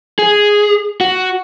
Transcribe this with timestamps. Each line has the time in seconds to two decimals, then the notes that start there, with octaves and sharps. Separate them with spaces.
0.19 G#4
1.01 F#4